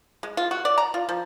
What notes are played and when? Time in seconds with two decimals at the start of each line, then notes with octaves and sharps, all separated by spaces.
0.23 G#3
0.37 F4
0.51 F#4
0.65 D5
0.78 A#5
0.94 F4
1.09 F3